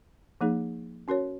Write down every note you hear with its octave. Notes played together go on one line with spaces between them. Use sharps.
F3 A#3 D#4 G#4
C#4 F#4 A#4 C#5